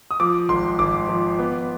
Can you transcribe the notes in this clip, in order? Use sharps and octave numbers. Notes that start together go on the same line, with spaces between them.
D#6
F3 D6
G#1 C6
G#1 D6
F3
B3